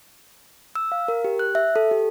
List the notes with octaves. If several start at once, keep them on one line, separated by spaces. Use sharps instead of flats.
E6
F5
A#4
G4
F#6
E5
A4
G4